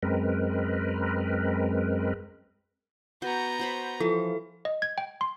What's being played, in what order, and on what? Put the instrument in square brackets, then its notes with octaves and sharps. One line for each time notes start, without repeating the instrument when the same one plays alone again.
[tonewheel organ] F#2 G#3 C4 A#4 B4
[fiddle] B3 A#5 [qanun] F#4 [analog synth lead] G6
[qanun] F#4 C5 B5
[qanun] E3 [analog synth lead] F3 [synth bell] A4
[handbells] D#5
G#6
G5
C6